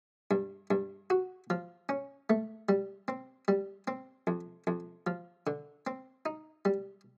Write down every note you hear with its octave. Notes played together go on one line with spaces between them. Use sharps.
G2
G2
F#4
F3
C#4
A3
G3
C4
G3
C4
F2
F2
F3
D3
C4
D#4
G3